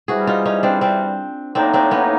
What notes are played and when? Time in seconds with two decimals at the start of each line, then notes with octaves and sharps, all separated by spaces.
0.08 C3 E3 G3 F#4 G#4
0.27 D#4 F4
0.45 C#4 D#4
0.63 C4 D4
0.81 C4 D4
1.55 A2 F#3 A#3 C4 D4 D#4
1.73 C4 D4
1.91 B3 C#4